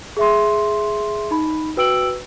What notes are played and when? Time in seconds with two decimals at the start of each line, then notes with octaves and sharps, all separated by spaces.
0.17 G#4 E5 C6
1.31 D#4 B5
1.77 F#4 B4 G5 E6 D7 F#7